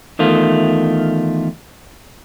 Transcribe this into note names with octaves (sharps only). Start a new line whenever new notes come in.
E2 D#3 A3 F4